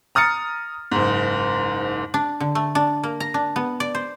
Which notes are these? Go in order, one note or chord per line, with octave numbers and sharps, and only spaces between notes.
A#5 D#6 F6 A6 C#7
F#1 G#2
D4
D3
A3
D4
A#3
A#5
D4
B3
D5
C5